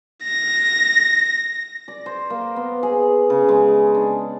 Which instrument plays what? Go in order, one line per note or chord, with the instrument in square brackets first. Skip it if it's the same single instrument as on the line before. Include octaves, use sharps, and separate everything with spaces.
[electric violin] A#6
[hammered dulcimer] D5
C5
A#3
B3
G#4
C#3
G#3
D4